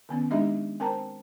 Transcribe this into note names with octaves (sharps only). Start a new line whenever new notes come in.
D#3 B3 C#4
G#3 D4 D#4 G4 D#5 E5
C4 A#4 C5 G5 A5 A#5